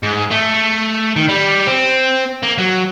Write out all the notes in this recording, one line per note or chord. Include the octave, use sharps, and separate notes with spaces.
G#2
A3
D#3
G3
C4
A#3
F#3